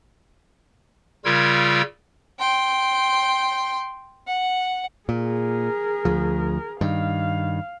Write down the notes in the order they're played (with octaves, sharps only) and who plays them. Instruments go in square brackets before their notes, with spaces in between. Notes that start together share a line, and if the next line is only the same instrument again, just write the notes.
[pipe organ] C#3 G3 F4 A#4 E6 G#6
[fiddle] G5 C6
F#5
[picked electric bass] A#2 [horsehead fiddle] G#4 A#4
[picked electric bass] D2 F3
[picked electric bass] G2 D#3 [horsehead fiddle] F5